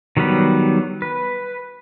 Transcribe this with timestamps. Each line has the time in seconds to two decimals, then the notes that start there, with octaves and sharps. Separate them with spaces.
0.17 D#3 F#3 G3 B3 B5
1.02 B4